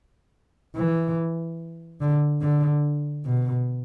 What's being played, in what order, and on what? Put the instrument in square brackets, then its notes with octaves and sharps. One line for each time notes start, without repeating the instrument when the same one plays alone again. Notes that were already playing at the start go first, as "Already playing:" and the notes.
[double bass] E3
D3
D3
B2